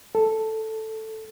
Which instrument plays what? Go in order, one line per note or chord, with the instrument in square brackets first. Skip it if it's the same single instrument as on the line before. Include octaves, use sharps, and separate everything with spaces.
[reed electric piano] A4